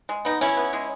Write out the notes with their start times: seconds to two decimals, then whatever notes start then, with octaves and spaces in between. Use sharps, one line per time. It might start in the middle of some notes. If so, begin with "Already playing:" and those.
0.09 G#3
0.25 B3 D#4
0.41 B2 C#4 E4
0.57 B3
0.73 G#3